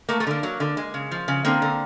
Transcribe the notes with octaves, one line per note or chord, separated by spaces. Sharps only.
A3 A#3
A3
D3 A#3
F#3
D3
G#3
C#3
F3
C#3
D3 A#3 C4
D3